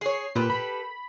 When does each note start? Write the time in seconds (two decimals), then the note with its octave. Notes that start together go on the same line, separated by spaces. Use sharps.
0.01 G#4 C#5 C7
0.35 A#2 G4 A4 B4
0.50 B5